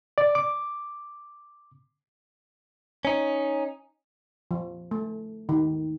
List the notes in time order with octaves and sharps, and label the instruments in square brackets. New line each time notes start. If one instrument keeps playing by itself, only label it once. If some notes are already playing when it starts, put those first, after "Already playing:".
[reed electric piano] D5
D6
[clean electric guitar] C#4 D#4
[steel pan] F3
A3
D#3